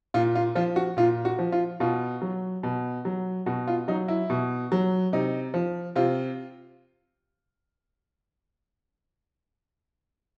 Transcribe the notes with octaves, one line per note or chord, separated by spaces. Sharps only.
A#2 F4
F4
F3 F4
F#4
A#2 F4
F#4
F3
F4
B2 F4
F#3
B2
F#3
B2 F#4
F4
F#3 D#4
E4
B2
F#3
C3 D#4
F3
C3 F4